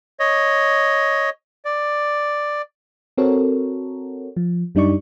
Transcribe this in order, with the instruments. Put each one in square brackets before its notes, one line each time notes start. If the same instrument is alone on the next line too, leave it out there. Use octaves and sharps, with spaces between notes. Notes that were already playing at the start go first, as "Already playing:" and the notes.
[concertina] C#5 D#5
D5
[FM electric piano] C4 F#4 A4 A#4 C#5
F3
F#2 G3 D4 D#4 D5 C#6